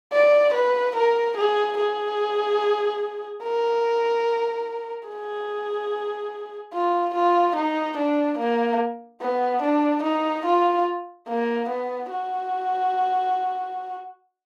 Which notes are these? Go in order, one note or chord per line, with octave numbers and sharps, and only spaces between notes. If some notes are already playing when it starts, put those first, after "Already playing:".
D5
B4
A#4
G#4
G#4
A#4
G#4
F4
F4
D#4
D4
A#3
B3
D4
D#4
F4
A#3
B3
F#4